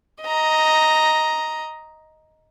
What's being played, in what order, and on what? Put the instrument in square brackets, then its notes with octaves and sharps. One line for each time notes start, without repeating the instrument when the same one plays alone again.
[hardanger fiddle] D#5 A#5